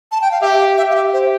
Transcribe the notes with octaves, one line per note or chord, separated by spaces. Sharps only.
A5
G5
F5
G4 E5
F5
G4 E5
F5
E5
C5